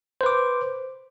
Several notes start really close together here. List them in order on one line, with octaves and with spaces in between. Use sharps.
C5 B4 D6